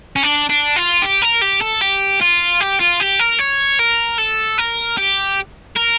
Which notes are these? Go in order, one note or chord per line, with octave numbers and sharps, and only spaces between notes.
C#4
D4
D4
F4
G4
A#4
G4
A4
G4
F4
G4
F4
G4
A#4
C#5
A#4
A4
A#4
G4
A#4